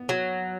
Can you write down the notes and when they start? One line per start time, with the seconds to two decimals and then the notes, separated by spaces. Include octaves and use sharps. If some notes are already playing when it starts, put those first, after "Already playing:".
Already playing: B3
0.09 F#3